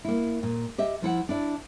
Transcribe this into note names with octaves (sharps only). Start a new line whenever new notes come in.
A#3 E4
A#2
G4 D#5 E5
F3 E4 F#5
D4 E4 D5